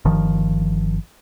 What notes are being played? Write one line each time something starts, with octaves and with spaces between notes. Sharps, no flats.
G1 D#3 F3